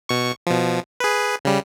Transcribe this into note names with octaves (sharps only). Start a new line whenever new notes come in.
B2 C#6
B2 F3
G#4 B4
C#3 G3